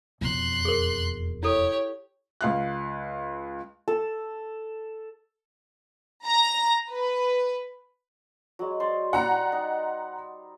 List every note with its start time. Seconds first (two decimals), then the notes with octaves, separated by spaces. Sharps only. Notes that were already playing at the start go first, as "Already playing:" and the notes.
0.21 E1 F2 C6 F#6
0.65 G#4 A#4
1.43 E4 G4 A4 C#5
2.41 C#2 F5 F#6
3.88 A4
6.25 A#5
6.91 B4
8.59 F#3 G#3
8.80 C5 D5
9.13 G3 F#5 A#5
9.52 D#4